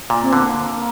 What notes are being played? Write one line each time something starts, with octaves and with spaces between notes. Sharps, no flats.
A#2
C4
D3 A#3